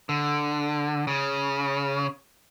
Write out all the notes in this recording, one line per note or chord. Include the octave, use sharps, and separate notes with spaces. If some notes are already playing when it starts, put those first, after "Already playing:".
D3
C#3